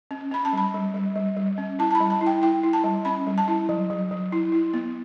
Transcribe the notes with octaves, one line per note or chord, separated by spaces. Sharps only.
C#4
C#4 B5
A5
G3 B5
G3
G3
G3
G3
C#4
E4 A5
A5
B5
G3
A5
E4
G5
E4 G5
E4
A5
G3
C#4 B5
G3
A5
E4
F#3
F#3
F#3
E4
E4
B3